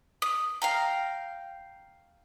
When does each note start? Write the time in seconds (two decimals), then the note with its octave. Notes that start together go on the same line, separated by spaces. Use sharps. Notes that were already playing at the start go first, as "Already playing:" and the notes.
0.22 D#6
0.62 F5 G5 A#5